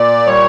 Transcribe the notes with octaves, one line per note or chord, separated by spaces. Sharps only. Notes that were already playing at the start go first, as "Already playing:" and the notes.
Already playing: A#2 D5
G3 C#5